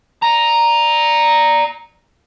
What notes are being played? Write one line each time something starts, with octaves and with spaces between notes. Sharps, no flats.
D5 A#5